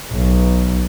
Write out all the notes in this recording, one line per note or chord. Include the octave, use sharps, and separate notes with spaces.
B1